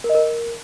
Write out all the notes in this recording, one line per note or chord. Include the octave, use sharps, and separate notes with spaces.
A#4
D#5
A#4